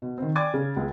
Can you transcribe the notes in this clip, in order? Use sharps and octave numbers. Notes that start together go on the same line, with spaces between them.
B2
D#3 C4
D5 G5 G#5 D6 G#6 A6
C#3
C#2 G#3